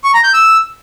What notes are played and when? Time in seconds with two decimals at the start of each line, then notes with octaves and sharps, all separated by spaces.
0.04 C#6
0.14 A#5
0.24 G6
0.34 E6